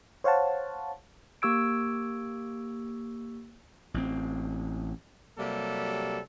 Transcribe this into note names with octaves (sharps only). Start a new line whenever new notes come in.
C5 C#5 F5 F#5 A5
A#3 G4 C#6 E6 G#6 D7
A1 C4
C3 F#3 G3 A#3 A4